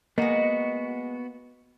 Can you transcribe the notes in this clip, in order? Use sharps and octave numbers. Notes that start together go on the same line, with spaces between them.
G#3 A#3 B3 F#4 D#5